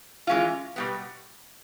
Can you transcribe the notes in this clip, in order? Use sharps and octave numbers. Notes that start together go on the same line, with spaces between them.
E3 G#3 C#4 F4
B2 G3 B3